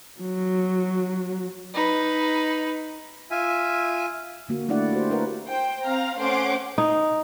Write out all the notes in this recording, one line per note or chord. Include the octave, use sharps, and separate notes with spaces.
F#3
D#4 B4
F4 E5 G#5
D3 A#3 F#4
A3 D4 E4 D5 F#5
F#4 G4 C5
E4 A#4 B4 F#5
C5 G5
C4 F5 A#5 F6
A3 C#4 C5 F#5 C6 D6
D#4